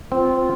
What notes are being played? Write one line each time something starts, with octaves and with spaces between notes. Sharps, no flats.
C4 F4